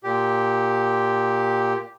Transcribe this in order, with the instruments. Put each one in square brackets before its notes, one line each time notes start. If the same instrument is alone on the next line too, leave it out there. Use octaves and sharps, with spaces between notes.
[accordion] A#2 G4